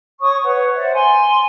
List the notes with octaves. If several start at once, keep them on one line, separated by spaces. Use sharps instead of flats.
C#5 C#6 D#6
B4 C#5 F#5
C5 D5 E5 F#5
G#5 C6